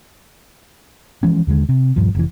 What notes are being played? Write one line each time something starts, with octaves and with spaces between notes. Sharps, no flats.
E3 F3 G#3 C#4
D#2 D3 G#3
C3
D#1 G2 F3
F1 E3